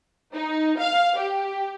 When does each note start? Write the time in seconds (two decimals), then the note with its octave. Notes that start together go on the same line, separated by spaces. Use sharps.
0.34 D#4
0.79 F5
1.18 G4